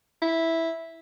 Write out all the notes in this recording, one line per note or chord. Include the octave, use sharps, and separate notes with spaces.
E4